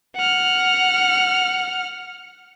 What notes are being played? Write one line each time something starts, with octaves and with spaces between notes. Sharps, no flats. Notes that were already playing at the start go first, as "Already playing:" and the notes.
F#5 F6